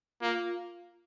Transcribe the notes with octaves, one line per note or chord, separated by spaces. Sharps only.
A#3 F4